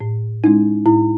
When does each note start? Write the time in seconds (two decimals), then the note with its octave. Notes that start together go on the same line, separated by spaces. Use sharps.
0.01 A2
0.44 G#3 C#4 D#4 E4
0.86 A2 E4